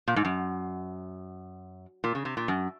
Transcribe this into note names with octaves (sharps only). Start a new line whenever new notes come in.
A#2
G#2
F#2
A#2
C#3
C3
A#2
F#2